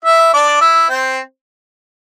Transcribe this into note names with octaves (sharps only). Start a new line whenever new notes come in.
E4 E5
D4 D5
E4 E5
C4 C5